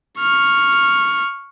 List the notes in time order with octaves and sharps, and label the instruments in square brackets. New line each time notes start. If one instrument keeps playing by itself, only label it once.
[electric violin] C#6 F6